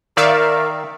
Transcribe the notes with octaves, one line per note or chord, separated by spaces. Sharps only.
D#3 A#4 D5 E5 F5